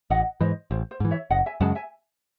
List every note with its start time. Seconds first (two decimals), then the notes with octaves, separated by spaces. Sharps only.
0.10 A1 D#5 F#5
0.41 G#2 E3 C5 D#5
0.71 A1 C5
0.91 C5
1.00 G#2 E3
1.11 C#5 E5
1.30 F#1 D#5 F#5
1.46 E5 G#5
1.61 F#2 C#3 G#3 F#5 A5
1.72 F#5
1.75 E5 G#5